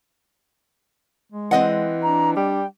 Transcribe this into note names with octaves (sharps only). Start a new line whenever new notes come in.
G#3
E3 C4 D#5 F#5
D4 A#5
G3 G5